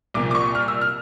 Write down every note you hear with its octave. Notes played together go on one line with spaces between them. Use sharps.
C2 A#2 F3 D6
D6
C#6
F6
E6
F6